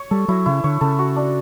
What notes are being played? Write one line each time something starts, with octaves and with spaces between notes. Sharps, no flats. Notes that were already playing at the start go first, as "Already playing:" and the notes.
Already playing: C#5
G3 A4
F#3 E4
C#3 E4
D3 C#5
C#3 A4
F#4
D4